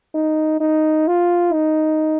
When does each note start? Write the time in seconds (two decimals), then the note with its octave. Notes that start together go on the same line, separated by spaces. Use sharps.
0.15 D#4
0.60 D#4
1.07 F4
1.53 D#4